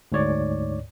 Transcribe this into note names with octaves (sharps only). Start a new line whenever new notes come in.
D2 G#2 C#5 D5